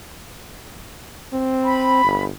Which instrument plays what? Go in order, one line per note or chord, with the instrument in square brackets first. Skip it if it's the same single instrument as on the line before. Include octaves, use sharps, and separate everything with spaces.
[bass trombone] C4
[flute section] B5
[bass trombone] G1